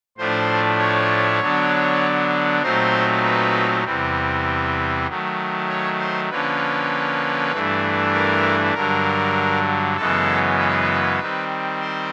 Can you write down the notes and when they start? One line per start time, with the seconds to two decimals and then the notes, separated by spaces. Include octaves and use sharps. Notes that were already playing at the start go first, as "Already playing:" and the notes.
0.18 A2 F3 A3 D4 C5
0.78 C#5
1.40 D3 F#3 B3 D4
2.62 A#2 F#3 A3 C4 D#4 C5
3.24 B4
3.84 E2 C3 E3 G3 C4
5.07 D#3 F#3 A3
5.68 C#5
5.99 C5
6.30 D3 F3 A#3 C#4 B4
7.51 G2 E3 A3 D4
8.13 A#4
8.74 G2 D3 F#3 A#4
9.96 F#2 C#3 E3 G#3 B3 A4
10.58 B4
11.19 D#3 G3 C4
11.80 C5